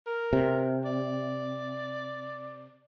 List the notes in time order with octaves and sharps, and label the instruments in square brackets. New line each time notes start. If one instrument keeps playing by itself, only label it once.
[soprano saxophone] A#4
[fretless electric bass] C3
[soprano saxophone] D5